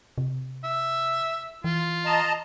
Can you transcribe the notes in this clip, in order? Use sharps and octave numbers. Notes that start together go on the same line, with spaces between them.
C3
E5
E3 F4
D#5 A5 A#5